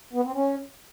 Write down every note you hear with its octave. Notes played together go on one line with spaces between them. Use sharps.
B3
C4
C#4